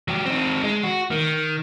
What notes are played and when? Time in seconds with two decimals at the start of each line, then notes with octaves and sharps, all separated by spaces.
0.08 F#3 G4
0.26 C4 D#4
0.64 G#3
0.83 F#4
1.11 D#3